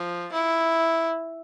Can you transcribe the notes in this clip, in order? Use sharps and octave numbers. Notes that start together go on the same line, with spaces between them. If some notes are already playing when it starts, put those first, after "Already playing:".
Already playing: F3
E4